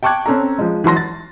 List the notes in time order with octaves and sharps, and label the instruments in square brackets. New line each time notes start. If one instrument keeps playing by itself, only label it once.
[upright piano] G5 A5 C#6 D6 F#6 G#6
C4 C#4 A4 A#5
F3 G#3
E3 F#3 C6 A#6
A6